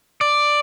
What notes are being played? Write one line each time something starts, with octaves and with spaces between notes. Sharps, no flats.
D5